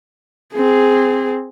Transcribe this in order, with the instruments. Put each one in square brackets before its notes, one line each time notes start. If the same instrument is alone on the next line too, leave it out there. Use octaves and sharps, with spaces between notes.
[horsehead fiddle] C4 G#4